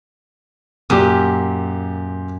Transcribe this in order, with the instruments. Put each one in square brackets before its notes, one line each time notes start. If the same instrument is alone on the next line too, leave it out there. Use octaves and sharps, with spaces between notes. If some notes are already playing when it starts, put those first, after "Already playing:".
[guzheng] F#2 [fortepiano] A#2 G4